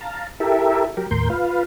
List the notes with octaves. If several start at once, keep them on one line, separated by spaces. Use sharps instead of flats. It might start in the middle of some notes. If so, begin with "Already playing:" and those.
F5 A5 A#5
E4 G4 A4 A#4 E5
F#3 G4 A#4
D#2 A2 A#4 C6 G6
F4 B4 F5